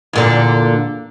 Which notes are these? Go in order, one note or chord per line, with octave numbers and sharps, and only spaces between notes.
E2 A#2 D3